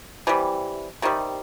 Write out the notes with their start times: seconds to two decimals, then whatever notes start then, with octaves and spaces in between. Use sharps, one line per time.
0.27 C3 E3 G3
1.02 C3 D#3 G3